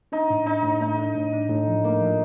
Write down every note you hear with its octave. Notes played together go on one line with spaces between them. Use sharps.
D4 D#4
A2
D4 D#4
A2
A3 D#4
D4
A2
D4
A2
F3
A3 A#3
F3